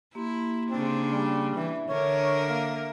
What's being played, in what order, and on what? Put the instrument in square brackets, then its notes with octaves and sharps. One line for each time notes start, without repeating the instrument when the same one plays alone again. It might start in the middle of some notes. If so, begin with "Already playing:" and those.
[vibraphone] A#3 G4 C6 [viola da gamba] E4
[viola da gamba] C#3 D4 [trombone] C4
[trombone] G3
[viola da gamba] E3 [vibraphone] E5
[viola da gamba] D3 A#4 [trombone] C#5
[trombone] A#3